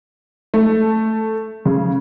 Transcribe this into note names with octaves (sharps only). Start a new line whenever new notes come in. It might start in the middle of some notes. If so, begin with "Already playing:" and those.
A3
C#3